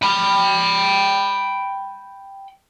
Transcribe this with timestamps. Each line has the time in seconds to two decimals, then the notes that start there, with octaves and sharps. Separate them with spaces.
0.02 G5 B5